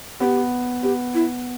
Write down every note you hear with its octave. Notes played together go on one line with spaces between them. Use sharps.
B3 G4
B3 G4
E4